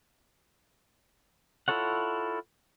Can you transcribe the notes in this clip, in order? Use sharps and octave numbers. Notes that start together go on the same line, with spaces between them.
E4 F4 A4 C#5 F#5